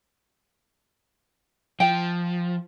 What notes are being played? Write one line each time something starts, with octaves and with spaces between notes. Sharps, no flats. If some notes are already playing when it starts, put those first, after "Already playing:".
F3 G5